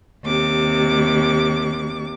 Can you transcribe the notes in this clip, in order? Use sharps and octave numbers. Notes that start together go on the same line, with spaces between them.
D#2 C3 D6